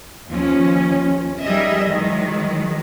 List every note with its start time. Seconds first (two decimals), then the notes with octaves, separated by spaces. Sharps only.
0.30 D#2 F3 C#4
1.42 G3 D#4 G#4 A#4 D#5 E5
1.89 D#3 E3 F#3 G#3